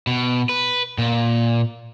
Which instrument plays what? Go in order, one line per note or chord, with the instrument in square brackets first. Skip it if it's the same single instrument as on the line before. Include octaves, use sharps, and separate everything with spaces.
[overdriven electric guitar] B2
B4
A#2